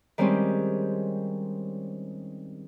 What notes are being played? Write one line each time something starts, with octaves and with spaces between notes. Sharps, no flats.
D#3 G3 G#3 C4 C#4 G4